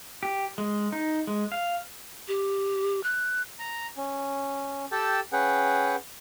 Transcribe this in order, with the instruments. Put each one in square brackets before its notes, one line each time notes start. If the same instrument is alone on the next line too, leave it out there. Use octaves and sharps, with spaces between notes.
[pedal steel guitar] G4
G#3
D#4
G#3
F5
[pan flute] G4
F#6
[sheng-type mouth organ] A#5
C#4
G4 A4 G5 A5 E6
C#4 G#4 B4 F#5 G5